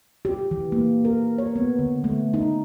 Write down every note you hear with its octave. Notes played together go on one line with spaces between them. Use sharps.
G4
E3
A#3
A#4
C#5
B3
D3
A3
D#4